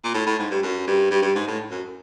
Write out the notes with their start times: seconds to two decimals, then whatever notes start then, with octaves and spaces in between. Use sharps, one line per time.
0.04 A#2
0.14 A2
0.26 A2
0.39 G#2
0.51 G2
0.63 F#2
0.87 G2
1.11 G2
1.22 G2
1.35 G#2
1.47 A2
1.71 F#2